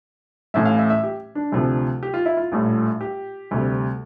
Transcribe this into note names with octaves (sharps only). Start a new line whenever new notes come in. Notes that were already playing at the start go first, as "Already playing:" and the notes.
A1 A2 E3 E5
F5
E5
E5
G4
D4
D2 C3 F3
G4
F4
E4
F4
A#1 A2 G3
G4
D2 C3 G3